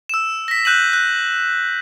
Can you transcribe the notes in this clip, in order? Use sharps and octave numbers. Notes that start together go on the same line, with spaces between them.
E6 E7
A#6 B6
F#6 G6 D#7 E7 F#7
F#6